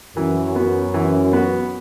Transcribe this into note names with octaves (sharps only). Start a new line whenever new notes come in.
F#2 E3
B3 F#4
E3
B3 F#4